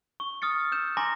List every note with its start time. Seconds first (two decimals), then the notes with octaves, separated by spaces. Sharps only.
0.20 C#6
0.42 D#6 F6 A6 C#7
0.72 E6 G6 E7
0.97 G#5 A#5 C6 D6 A#6